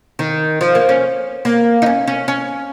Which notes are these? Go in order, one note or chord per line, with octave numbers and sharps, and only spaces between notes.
D#3
F3
A#3
C#4
A#3
D#4
C#4
C#4
C#4